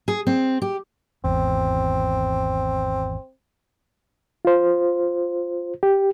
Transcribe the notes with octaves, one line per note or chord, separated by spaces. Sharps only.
G#4
C4
G4
G#1 E2 C4
F4 C5
G4